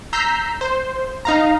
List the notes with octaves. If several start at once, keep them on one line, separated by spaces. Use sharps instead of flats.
A#5 E6 G6 B6 C7
C5
D#4 F5 A#5